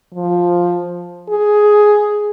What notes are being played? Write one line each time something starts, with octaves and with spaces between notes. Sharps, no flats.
F3
G#4